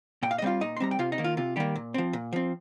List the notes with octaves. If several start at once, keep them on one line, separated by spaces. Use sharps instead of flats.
A#2 G5
F5
D#5
G3 C4 F4 F5
A#2 D#4 D#5
C6
G3 C4 A#5
G5
C3 F4 F5
D#4 D#5
D#3 A#3
F4
C3 F4
D#3 G3 A#3 G4
A#2
F3 C4
A#2
F3 C4